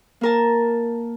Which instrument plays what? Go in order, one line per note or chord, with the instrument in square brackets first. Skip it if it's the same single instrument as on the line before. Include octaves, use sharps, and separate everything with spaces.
[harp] A#3 A#4 A5